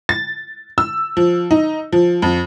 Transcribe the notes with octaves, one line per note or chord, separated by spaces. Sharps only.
A6
E6
F3
D#4
F3
F2